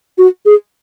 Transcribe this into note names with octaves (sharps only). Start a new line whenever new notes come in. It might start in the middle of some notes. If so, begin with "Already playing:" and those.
F#4
G#4